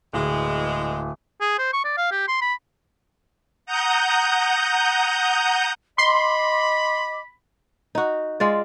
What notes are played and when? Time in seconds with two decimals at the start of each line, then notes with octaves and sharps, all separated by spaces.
0.13 D1 E3 G#3
1.41 G#4
1.59 C5
1.73 C#6
1.84 D5
1.97 F5
2.11 G4
2.28 C6
2.41 B5
3.66 F#5 A#5 D#6 G6
5.98 D#5 B5 C6 D6
7.95 D#4 F#4
8.40 G#3 F4 D5